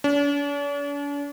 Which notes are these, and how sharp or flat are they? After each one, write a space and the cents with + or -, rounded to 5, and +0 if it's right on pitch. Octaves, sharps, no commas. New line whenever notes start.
D4 -45